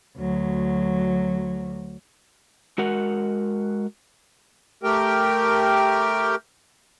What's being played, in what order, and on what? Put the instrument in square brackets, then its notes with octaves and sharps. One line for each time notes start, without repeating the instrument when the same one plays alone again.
[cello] D2 F#3
[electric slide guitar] G#3 F#4 A#4 F#5
[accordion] A3 G4 A#4 G5